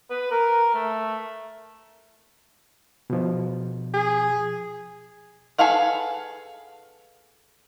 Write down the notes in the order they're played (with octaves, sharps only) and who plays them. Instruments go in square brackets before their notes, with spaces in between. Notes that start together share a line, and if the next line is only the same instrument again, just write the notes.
[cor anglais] B4
A#4
A3
[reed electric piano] B2 F3
[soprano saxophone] G#4
[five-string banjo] G#4 A4 B4 F5 F#5